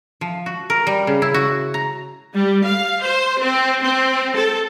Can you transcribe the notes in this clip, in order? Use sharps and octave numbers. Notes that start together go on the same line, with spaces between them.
F3
F#4
A#4
G3
C#3
E4
F#4
A#5
G3
F5
C5
C4
C4
A4